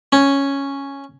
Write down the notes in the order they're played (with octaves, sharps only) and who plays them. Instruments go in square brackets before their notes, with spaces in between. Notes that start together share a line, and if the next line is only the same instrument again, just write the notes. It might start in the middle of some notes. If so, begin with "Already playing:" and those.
[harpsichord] C#4